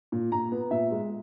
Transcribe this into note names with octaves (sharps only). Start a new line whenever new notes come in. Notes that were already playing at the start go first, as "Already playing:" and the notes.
A#2
A#2 A#5
B3
A#2 E5
G#3